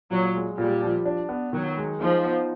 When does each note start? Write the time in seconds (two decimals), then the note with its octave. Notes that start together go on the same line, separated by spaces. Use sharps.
0.11 A#2 F#3
0.35 G#3
0.58 A#2 G3
0.82 F3
1.06 D4
1.29 B3
1.53 D#3 F#3
1.77 G#3
2.00 F3 D#4
2.24 B3